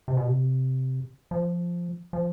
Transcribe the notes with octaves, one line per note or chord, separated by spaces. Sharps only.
C3
B2
C3
F3
F3